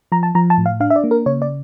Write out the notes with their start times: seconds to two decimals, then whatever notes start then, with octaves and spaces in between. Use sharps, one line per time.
0.12 F3 A#5
0.23 A5
0.35 F3 A#5
0.50 A5
0.58 A2
0.66 F5
0.80 D4 F5
0.90 E5
0.96 D5
1.04 A#3
1.11 A#4
1.26 C#3 C#5
1.42 D5